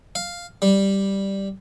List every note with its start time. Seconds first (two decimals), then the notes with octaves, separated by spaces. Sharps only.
0.15 F5
0.62 G3